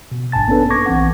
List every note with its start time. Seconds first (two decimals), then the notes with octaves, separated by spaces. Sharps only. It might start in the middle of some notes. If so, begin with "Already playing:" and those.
0.12 B2
0.32 G#1 G2 G#5 A5 A6
0.48 A#3 B3 C#4 D4 A4 B4
0.70 C#6 D6 G#6 A#6
0.86 A#1 E3 C4 F#5